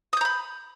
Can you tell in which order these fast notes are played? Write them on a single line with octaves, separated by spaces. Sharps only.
D#6 G6 A#5 B5